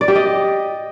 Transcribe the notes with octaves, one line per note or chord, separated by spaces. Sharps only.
D5
G4
D#5